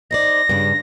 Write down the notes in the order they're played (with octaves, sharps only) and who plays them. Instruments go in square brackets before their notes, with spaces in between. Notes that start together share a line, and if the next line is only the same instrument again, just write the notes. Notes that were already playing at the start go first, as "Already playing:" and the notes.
[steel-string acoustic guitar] D#4 C5 D5 [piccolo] A#6
[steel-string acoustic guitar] G2 C#3 D4